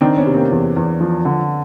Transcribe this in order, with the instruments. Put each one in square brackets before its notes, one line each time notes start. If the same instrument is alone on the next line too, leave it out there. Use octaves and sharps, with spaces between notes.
[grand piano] D#3 [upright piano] C4 D4
[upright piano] B3 C#4
[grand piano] C3
[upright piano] A#3 C4
[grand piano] E2
E2
F3
D3